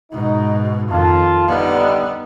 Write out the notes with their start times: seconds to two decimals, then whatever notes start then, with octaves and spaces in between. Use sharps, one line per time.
0.11 G#2 B2 D#4
0.89 F2 D#3 F4 A5
1.48 D3 G3 B3 D#4